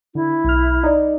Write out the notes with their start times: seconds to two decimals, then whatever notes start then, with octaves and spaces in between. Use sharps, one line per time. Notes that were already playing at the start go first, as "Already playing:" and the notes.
0.15 D3 E4
0.44 B1 F6
0.83 D#4 D5